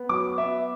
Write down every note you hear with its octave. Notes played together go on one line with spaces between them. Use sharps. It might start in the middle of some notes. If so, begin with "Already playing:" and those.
Already playing: B3
F#3 D6
B3 E5